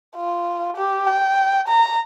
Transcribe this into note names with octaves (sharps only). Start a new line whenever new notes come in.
F4
G4
G5
A#5